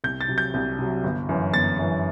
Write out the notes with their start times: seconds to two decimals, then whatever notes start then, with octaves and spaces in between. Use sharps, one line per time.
0.04 C2 G6
0.21 A6
0.28 C3 F#3
0.38 G6
0.54 C2
0.79 C3 F#3
1.04 G1
1.29 F#2 E3
1.53 G1 A6
1.79 F#2 E3